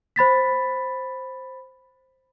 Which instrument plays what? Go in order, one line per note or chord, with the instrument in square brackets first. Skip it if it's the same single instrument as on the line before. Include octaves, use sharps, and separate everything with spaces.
[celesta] C5 B5 A6 B6